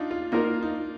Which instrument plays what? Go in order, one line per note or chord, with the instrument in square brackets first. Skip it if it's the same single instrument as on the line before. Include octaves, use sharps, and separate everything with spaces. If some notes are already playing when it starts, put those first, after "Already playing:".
Already playing: [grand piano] D4 D#4 F4
F4
[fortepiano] A#3 F4 A#4 [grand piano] D#4
[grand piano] D#4